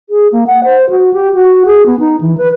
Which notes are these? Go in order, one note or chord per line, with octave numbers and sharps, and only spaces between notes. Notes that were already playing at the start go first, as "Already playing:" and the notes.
G#4
A#3
F#5
C5
F#4
G4
F#4
G#4
B3
D#4
E3
B4